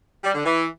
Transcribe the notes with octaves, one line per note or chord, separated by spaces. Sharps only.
G3
D3
E3